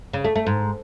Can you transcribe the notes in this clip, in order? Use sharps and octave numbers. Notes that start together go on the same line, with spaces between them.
C#3
A3
A3
G#2